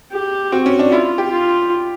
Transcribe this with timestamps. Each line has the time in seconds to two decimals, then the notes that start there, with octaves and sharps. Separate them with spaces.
0.13 G4
0.52 C4 F#4
0.66 C#4
0.79 D4
0.92 E4 F4
1.18 G4
1.31 F4